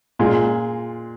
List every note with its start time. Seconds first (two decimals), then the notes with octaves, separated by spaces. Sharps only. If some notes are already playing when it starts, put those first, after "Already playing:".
0.19 A#2 G#3 F4